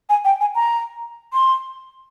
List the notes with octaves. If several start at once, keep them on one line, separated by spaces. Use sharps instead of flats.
G#5
G5
G#5
A#5
C6